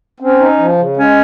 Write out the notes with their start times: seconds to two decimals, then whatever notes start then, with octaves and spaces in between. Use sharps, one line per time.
0.20 C4 C#4
0.39 D#4
0.58 F3
0.78 C#3
0.97 G#3 C#4